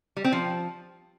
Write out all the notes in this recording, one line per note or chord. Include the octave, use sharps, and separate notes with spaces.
G3
C4
F3